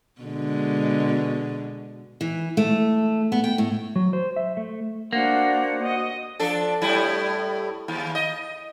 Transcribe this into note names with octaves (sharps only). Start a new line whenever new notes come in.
B2 D3 G#3
E3
A3
B3
G5
A2
F#3
C5
E5
A3
A#3 D4 F#4 C5 F#5
D#5
F3 D4 A4
A2 G3 E4
D#2
D#5